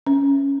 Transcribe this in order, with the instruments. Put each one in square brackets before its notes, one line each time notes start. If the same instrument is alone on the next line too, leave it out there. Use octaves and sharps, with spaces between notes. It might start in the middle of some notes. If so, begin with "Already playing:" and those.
[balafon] C#4